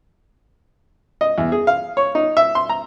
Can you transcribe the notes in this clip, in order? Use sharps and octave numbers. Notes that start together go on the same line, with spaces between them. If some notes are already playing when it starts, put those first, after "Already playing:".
D#5
E2
G#4
F5
C#5
D#4
E5
C6
A#5